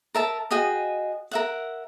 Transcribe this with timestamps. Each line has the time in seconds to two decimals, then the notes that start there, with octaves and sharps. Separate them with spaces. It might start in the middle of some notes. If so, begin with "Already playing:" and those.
0.15 A#4 E5 A5
0.51 F#4 G#4 D#5 G5
1.31 A#4 E5 F#5